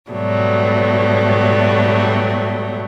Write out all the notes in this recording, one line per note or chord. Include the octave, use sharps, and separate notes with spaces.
G#2 B2 F#3 G3 A3